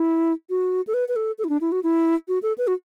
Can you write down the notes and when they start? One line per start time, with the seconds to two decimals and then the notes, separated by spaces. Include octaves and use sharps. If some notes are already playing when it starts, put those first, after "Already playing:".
Already playing: E4
0.50 F#4
0.87 A4
0.94 B4
1.08 B4
1.16 A4
1.38 A4
1.44 E4
1.49 D4
1.61 E4
1.72 F#4
1.83 E4
2.28 F#4
2.42 A4
2.58 B4
2.67 F#4